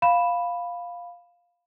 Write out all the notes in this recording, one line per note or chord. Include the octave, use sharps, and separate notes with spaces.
F5 B5 E7